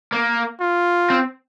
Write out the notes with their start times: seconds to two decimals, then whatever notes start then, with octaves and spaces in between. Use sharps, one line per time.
0.13 A#3
0.61 F4
1.10 C4